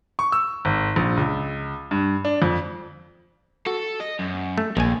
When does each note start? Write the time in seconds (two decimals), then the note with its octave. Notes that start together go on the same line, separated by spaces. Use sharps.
0.19 C#6
0.32 E6
0.65 G#1
0.96 A#1
1.17 C#2
1.91 G2
2.25 D4
2.42 F2
3.67 F#4 A4
4.00 D#5
4.19 F#2
4.58 A3
4.77 A#1 D#2 G#5